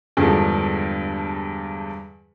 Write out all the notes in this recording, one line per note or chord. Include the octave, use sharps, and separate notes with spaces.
E2 G2 D3 F3 G#3